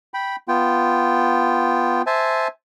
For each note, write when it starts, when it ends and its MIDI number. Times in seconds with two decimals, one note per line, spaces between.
0.14 0.36 79
0.14 0.36 83
0.48 2.02 59
0.48 2.02 65
0.48 2.02 79
2.06 2.48 72
2.06 2.48 76
2.06 2.48 80
2.06 2.48 81